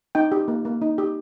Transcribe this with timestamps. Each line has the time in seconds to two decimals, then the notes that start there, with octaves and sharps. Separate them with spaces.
0.15 D#4 G5
0.32 G4
0.48 A#3
0.65 A#3
0.82 D#4
0.98 G4